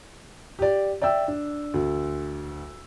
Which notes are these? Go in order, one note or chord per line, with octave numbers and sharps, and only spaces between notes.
G4 D5
D5 E5 G5 E6
D4
D2